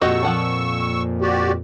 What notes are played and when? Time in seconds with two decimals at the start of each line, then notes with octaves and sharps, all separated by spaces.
0.02 F2 A#2 F#4 G4 D#5 C#6 E6
0.23 F3 F#5 A5
1.21 F#4 G4 D5